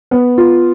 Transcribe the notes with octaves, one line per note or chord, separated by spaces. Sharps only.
B3
F4